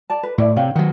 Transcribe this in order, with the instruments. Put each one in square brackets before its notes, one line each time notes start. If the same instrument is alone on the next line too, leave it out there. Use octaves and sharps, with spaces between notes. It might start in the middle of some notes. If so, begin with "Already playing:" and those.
[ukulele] D5 A5
B4
[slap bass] A2 [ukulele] E4 D5 E5
[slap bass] C3 [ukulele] C#5 F5 G5
[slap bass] D#3 F#3 [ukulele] F#5